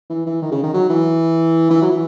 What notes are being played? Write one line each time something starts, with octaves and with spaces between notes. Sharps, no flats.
E3
E3
D#3
C#3
D#3
F#3
E3
E3
F#3
E3